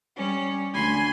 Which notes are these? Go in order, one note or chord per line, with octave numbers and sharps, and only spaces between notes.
G3 C#4
D2 G#5 B5 C6